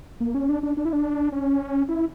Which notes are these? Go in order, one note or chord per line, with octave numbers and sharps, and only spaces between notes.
A#3
C#4
D4
D4
D4
E4
D4
C#4
E4